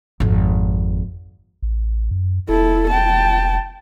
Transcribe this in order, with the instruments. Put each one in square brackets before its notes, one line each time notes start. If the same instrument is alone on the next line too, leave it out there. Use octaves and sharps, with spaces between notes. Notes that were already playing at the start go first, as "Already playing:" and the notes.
[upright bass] G#1 F2
[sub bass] A1
F#2
[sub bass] E1 [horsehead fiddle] E4 A4
[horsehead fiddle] G5 A5